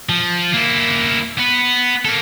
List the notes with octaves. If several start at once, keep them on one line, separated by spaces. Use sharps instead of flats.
F3
A#3 E4
B3 B4
A#3 A4